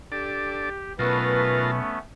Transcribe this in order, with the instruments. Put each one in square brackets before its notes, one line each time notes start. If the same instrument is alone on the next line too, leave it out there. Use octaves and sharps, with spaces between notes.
[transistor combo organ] D4 A4 D5 [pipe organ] G4
[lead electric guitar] B1 [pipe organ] A3 B3 C#4 [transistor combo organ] F4 A#4 A5 [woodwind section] B4